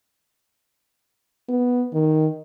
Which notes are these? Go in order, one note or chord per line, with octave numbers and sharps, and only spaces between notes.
B3
D#3